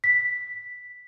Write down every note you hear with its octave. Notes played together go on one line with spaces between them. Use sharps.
B6